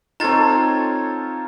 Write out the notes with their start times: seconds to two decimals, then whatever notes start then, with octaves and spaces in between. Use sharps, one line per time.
0.20 C4 D#4 F4 A4 C#5 A#5 A6